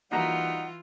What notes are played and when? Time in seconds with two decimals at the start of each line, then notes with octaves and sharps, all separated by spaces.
0.12 E3 G3 A#3 D#4 F4 F#4 F#5 A#5